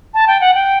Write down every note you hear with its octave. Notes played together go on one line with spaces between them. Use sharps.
A5
G5
F#5
G5